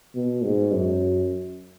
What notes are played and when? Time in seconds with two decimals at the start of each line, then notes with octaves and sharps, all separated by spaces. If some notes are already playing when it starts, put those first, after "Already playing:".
0.15 B2
0.44 G#2
0.72 F#2